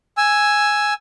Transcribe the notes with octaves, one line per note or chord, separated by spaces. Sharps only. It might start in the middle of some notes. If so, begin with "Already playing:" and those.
G#5 E6